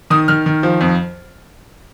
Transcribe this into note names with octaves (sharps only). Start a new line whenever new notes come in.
D#3 D#6
D#3 F6
D#3
F3
F2